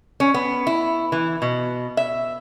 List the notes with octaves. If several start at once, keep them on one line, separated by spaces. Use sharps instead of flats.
C#4
B3
E4
E3
B2
E5